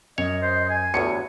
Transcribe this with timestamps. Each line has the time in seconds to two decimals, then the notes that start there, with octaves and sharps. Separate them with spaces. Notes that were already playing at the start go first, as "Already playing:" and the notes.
0.18 F#2 C#5 D#5
0.42 C5
0.70 G#5
0.94 G1 E2 A2 F#4 C#7